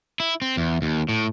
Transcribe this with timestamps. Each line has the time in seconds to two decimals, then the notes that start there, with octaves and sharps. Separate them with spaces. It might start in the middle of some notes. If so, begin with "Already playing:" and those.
0.20 E4
0.42 C4
0.57 E2
0.82 D#2
1.09 A2